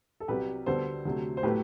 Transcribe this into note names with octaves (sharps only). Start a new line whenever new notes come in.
A4
C2 C3 F#3 G4 B4
D2 D3 G3 B3 A4 C5
D2 C3 F#3 A3
C5
A2 F#3 A3 G4 B4